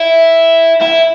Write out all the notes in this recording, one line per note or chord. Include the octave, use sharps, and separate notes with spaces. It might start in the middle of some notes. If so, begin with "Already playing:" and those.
Already playing: E4
E4